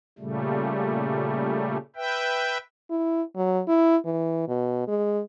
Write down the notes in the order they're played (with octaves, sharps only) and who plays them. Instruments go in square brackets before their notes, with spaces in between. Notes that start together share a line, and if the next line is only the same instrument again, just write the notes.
[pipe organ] A#2 C#3 G3 A3
B4 E5 G5
[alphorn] E4
F#3
E4
E3
B2
G#3